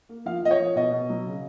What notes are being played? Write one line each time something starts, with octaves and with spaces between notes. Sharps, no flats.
A#3
F3 F5
F3 D#5
C#5
F3
B2 D#5
B2
F#3
C#3